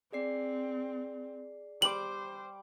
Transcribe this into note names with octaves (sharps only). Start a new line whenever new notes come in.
C4 G#4 D5 C7
G3 C5 D6 F#7